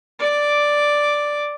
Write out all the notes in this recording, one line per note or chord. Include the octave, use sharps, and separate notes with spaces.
D5 D6